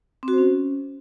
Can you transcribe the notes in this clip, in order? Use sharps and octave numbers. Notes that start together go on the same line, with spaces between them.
C4
F#4
C5
C#4